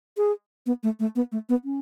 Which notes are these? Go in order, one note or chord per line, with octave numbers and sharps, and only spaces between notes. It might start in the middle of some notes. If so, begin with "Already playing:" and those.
G#4
B3
A3
A3
B3
A3
B3
C#4